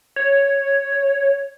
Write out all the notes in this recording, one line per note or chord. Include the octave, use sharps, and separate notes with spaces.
C#5